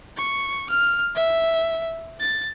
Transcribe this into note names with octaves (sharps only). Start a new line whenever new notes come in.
C#6
F6
E5
A6